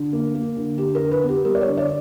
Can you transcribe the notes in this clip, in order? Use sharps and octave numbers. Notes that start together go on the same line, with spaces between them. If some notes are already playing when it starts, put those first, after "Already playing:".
Already playing: D3
A#3
A#3
D3
D3 G4
A#4
D3
B4
B3
G4
G3 A#4
D5
C#5
D3
D5